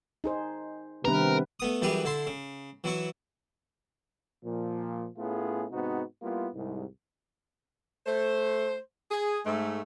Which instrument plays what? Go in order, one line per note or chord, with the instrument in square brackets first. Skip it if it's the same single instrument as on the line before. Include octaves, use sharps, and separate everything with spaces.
[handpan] D#4 G#4 C5
[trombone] C3 [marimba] D#3 G3 D4 [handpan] B3 C4 B4 [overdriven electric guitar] A#4
[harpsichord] A3 B3 D#6
F#2 E3 G3 G4 G#4 B4
D3 E4 A5 C6
C#3
E3 F#3 E4 C#5
[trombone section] A#2 F3
A2 A3 B3 C#4 F4 G#4
G#2 C3 B3 C4 D#4 F#4
G3 A#3 B3 E4 F4
C2 G#2
[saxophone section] A3 C5
G#4
G#2 A3